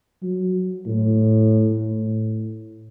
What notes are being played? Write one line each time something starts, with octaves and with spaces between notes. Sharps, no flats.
F#3
A2
A2